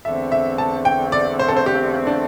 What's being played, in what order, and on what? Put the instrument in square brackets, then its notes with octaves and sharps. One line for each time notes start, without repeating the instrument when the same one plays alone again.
[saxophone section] E2 D3 A3 C4 [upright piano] E5
[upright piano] E5
A5
G5
D5
C5
A4
C5
G4
D4